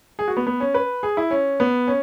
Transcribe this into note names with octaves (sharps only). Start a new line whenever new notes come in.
G#4
F#4
B3
B3
C#4
B4
G#4
E4
C#4
B3
C#4